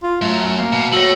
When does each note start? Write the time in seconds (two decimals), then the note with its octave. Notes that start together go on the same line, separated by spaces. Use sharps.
0.03 F4
0.21 F#2 A3
0.58 A#3
0.72 B2
0.92 A3 F#4 C#5 F#7